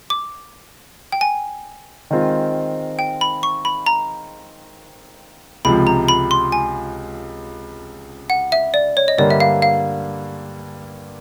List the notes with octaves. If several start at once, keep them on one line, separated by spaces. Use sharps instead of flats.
D6
G5
G#5
D#3 G#3 C4 F4
G5
B5
C#6
B5
A#5
C#2 C3 F3 B5
A#5
B5
C6
G#5
F#5
E5
D5
C#5
D#5
G2 D3 G3 A#3 D5
E5
F5
F5